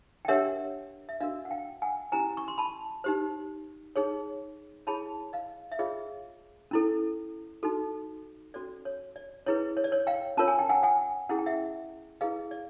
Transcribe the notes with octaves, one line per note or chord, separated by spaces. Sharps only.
G5
D4 G4 A#4 C#5 E5 F#5
E5
D4 F#4 A#4 D#5 F5
F#5
F5 G5
F#5 G#5
C#4 E4 G4 C5 G#5 A#5
C#6
C6
A5 B5
D#4 G4 C5
D#4 G#4 C#5
E4 G#4 C#5 A5 B5
D#5 F5
E5
F4 G#4 C#5 D#5 F5
C#4 E4 A4
D#4 F#4 A4
C#4 F#4 A4 C5 D5
C#5
D5
C#4 E4 G#4 B4 C#5
C#5
D5
C#5
F5 G5
C#4 F4 A#4 C#5 A5
G#5
G5
F#5 G#5
F#5 G#5
C#4 E4 G#4 F#5
G5
E5 F#5
E4 G#4 B4 D#5 F5
D5